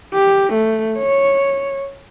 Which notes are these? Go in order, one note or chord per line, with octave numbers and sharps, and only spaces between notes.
G4
A3
C#5